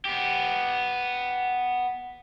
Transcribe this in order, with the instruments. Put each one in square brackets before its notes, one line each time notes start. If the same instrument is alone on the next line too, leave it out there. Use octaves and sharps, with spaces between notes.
[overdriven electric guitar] B3 G4